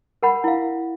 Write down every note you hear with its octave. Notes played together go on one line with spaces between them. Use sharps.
A#4 F#5 B5
E4 F5